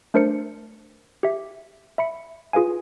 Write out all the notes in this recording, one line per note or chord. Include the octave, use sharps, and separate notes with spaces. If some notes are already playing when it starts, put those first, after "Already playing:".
A3 D4 A#4 C5 A5 C#7
G4 E5
E5 B5 C#7
F4 G#4 B4 F5 G#5